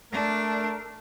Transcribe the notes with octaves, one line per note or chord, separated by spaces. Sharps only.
A3 D4 A4 A#4